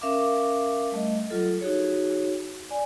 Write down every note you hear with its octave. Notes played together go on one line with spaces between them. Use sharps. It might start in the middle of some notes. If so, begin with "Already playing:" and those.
C#4 A#4 E5 F5 D6
G3 A3 D#5
F#3 F4 A4
D#4 F#4 G#4 C#5
D5 G#5